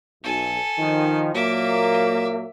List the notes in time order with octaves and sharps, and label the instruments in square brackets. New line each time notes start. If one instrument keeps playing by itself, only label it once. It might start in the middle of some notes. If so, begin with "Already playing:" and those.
[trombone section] B1 [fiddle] A4 G#5
[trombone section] D#3 F3
[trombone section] A#2 F#3 A#3 [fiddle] E5 D6